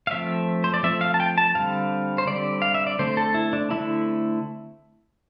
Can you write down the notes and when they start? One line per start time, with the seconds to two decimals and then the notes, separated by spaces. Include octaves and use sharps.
0.07 F5
0.11 F3 A3 C4 E5
0.64 C5
0.74 D5
0.83 F3 A3 C4 E5
1.01 F5
1.14 A5
1.20 G5
1.38 A5
1.55 D3 G3 C4 F5
2.18 C5
2.27 D3 G3 C4 D5
2.62 F5
2.74 E5
2.87 D5
2.99 D3 A3 C4 C5
3.17 A4
3.34 E4
3.53 D4
3.70 D3 A3 C4 E4